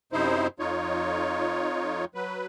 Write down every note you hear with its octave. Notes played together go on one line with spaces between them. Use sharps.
F#2 C3 D#4 E4 C5
F2 D#4 F4 C#5
F#3 B4